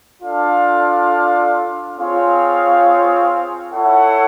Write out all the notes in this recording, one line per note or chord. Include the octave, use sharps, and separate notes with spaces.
D4 F4 A4 D5 F5
C4 F4 G#4 C#5 F5
E4 A4 C#5 F#5